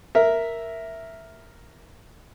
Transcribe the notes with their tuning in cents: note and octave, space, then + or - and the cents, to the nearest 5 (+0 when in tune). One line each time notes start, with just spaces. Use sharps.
A#4 +0 E5 +0